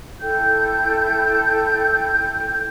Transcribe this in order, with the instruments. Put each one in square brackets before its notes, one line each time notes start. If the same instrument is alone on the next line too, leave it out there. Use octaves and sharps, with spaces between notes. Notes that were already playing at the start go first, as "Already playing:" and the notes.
[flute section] E4 A4 G5 G6